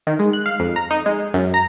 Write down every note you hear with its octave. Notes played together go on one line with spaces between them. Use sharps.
D#3
G#3
F#6
F5
F2
A#5
D#4
G#3
F#2
A#5